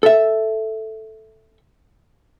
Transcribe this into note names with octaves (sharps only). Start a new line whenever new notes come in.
A4 E5